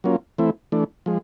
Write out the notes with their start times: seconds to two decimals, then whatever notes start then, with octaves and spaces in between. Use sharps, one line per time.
0.04 F#3 A#3 C#4 F4
0.38 E3 A3 C4 E4
0.72 E3 A3 D4
1.06 F3 G#3